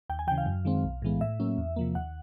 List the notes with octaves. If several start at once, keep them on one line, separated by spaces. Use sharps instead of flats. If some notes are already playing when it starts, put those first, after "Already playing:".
D#2 G5
G#5
C#3 E3 G5
F5
F#2
D#3 G#3 C4
B1
A2 E3 G#3 B3
A2 E5
F#3 A#3 C#4
E2
C3 F3 A#3
D#2 F#5